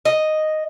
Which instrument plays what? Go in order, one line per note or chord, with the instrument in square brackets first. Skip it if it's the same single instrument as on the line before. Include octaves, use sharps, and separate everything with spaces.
[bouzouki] D#5